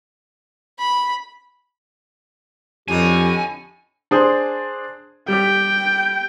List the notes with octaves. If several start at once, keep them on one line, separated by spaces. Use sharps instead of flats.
B5
F2 A2 D3 D#4 G4 G#5
D4 G#4 C5
G3 G4 G5